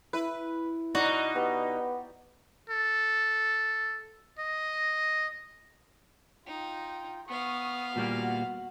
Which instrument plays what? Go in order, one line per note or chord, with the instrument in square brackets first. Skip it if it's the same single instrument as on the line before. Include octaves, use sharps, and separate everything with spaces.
[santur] E4 [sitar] B4
[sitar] B2 D#4 [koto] F#4 [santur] D5 A#5
[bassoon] B3 [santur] G4
[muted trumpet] A4
D#5
[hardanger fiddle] D#4 [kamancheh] F4 G5
[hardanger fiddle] B3 F5 [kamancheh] C#6 D#6
[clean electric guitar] A#2 G3 A#3 [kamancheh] F#4 F#5